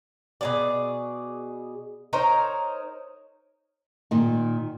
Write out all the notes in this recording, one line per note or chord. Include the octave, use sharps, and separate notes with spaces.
B2 G#4 D5
D#4 A#4 C5 C#5
A#2 D#3